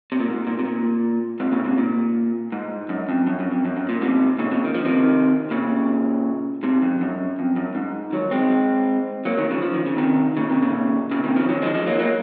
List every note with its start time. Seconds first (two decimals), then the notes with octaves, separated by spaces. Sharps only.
0.12 C3
0.20 A#2
0.28 G#2
0.47 A#2
0.59 C3
0.65 A#2
1.40 G#2 C3
1.52 A#2 C#3
1.65 G#2 C3
1.78 A#2
2.52 G#2
2.89 F#2
3.09 F2
3.27 F#2
3.40 F#2
3.51 F2
3.65 F#2
3.77 F#2
3.89 A#2
4.01 G#2 C3
4.39 A#2 C#3
4.51 A#2 C#3
4.64 D#3
4.74 F3
4.85 C3 D#3
5.51 A#2 C#3
6.63 G#2 C3
6.82 F2
7.01 F#2
7.39 F2
7.56 F#2
7.75 G#2
8.12 D#3 F#3
8.31 G#3 C4
9.25 F#3 A#3
9.37 D#3 F#3
9.50 C#3 F3
9.62 F3
9.74 D#3
9.86 C#3
9.97 C3 D#3
10.37 A#2 C#3
10.50 C3 D#3
10.62 A#2 C#3
11.11 A#2 C#3
11.24 C3 D#3
11.36 C#3 F3
11.49 D#3 F#3
11.62 F3 G#3
11.74 F3 G#3
11.86 F#3 A#3
11.99 F#3 A#3